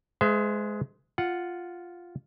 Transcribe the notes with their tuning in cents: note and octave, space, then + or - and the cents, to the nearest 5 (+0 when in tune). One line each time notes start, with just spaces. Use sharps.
G#3 +15 C5 -40 E5 +30
F4 +0 F#5 +0